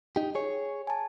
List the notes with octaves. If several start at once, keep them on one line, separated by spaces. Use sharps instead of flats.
D#4 G4
G#4 C#5
G#5 A5